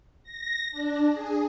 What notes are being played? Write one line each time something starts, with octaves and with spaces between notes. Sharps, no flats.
A#6
D4
G#4